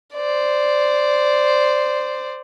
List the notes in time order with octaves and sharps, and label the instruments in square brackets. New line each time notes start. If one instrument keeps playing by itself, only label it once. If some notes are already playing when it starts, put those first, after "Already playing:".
[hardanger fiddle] C5 D5